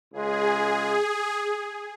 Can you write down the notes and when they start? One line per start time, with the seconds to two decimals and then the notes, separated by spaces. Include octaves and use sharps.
0.13 C#2 C#3 G#3 G#4